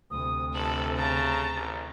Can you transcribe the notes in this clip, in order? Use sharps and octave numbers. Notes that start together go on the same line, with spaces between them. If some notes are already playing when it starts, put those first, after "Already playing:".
D2 C3 D#6
G1 A4 F#7
C#3 A5 A#5
A1